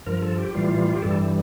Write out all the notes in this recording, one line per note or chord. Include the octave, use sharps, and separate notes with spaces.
G2 F3 A#4
A4
G4
A2 E3 G3 F4
G4
G2 E3 G3 A4